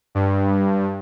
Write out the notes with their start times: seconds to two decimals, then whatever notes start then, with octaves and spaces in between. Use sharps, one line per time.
0.15 G2